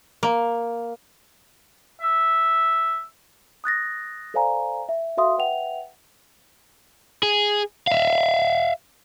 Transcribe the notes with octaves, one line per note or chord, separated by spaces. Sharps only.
A#3
E5
D#6 F#6 A6 A#6
A4 C5 D5 F5 G#5 A#5
E5
F#4 A4 E5 F5 C6 D#6
B4 E5 F#5 G5 F7
G#4
E5 F5